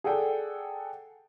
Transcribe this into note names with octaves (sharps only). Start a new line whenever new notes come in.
G#4 A4 D5 F#5 G5